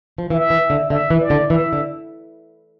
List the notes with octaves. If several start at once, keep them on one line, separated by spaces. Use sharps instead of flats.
F3
E3 E5
E3
D3
D3 E5
E3
D5
D3
E3 E5
D3